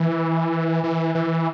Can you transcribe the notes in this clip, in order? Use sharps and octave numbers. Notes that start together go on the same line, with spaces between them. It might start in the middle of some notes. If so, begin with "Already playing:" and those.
Already playing: E3
E3
E3